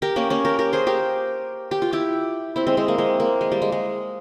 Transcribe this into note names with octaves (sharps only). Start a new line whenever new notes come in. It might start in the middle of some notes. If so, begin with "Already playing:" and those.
G4 A#4
A#3 C#4
A#3 C#4
G4 A#4
G4 A#4
G#4 C5
G4 A#4
G4
F4
E4 G4
C4 E4
G#3 C4
G#3 C4
A#3
G#3 C4
A#3
G#3
G3
G#3
G#3